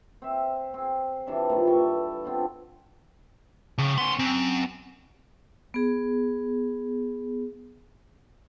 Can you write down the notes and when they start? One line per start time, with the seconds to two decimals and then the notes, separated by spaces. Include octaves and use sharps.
0.22 C4 E5
0.74 C4 G#4
1.27 C3 E3 D4 E5
1.49 A#2 D#3 G3
1.67 G2 E4 A4 C#6
2.24 B3 C4 D4 F4
3.78 F2 A2 C#3
3.98 B3 C#4 C6
4.19 F#2 C4
5.74 B3 G#4